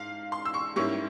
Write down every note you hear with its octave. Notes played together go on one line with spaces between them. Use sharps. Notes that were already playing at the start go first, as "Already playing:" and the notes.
Already playing: G#2 F5
C6
E6
C#6
G#2 G3 A#3 C#4 E4 C#6